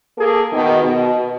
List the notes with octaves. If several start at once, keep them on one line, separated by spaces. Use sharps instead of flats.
A#3 G#4 A4
B2 D#3
B2